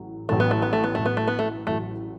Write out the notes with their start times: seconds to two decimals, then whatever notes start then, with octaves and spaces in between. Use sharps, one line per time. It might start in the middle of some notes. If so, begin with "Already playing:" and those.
Already playing: A1 A2 F#3
0.29 A1 A2 F#3 A3
0.40 B3
0.51 A3
0.62 B3
0.73 A3
0.84 B3
0.95 A1 A2 F#3 A3
1.06 B3
1.17 A3
1.28 B3
1.39 A3
1.67 A1 A2 F#3 A3